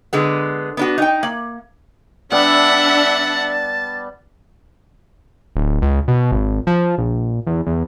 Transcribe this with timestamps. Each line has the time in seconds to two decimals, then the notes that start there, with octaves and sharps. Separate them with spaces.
0.13 D3 G#3 B3
0.77 B3 D4 F#4
0.98 D#4 G5
1.23 A#3
2.32 G3 B3 D4 D5 E5 F#5 A5
5.56 D1
5.82 C#2
6.08 B2
6.32 G#1
6.67 F3
6.98 A#1
7.47 E2
7.66 E2